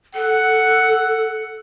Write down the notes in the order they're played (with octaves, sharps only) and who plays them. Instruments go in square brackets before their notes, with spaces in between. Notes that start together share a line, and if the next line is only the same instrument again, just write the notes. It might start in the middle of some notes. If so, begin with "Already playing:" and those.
[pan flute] A4 [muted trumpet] F#5